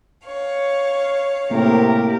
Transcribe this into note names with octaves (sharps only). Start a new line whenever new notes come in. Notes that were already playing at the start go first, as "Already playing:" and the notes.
C#5 F5
A2 C3 A#3 G4 A#4